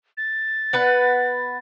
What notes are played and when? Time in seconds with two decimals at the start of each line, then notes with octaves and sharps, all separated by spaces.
0.17 A6
0.73 B3 B4 F#5